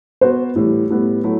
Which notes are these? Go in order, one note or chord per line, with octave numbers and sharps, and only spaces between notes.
B3 F#4 C5
A2 E3 G3
A2 G3 B3
F#3 A3 E4